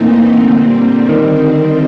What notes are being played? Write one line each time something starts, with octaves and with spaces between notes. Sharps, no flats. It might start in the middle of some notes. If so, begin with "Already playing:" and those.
Already playing: A#2 E3 A3 C4 D#4
D3 G3 C4
D#3